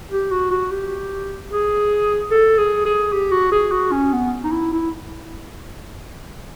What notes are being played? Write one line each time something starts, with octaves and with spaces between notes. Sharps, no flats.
G4
F#4
F#4
G4
G#4
A4
G#4
G#4
G4
F#4
G#4
F#4
C#4
B3
D#4
E4
E4